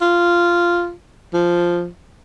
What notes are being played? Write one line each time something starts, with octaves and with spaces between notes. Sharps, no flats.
F4
F3